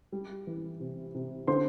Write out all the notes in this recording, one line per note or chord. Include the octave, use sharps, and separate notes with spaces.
G3
E3
C3
C3
D3 C5 C6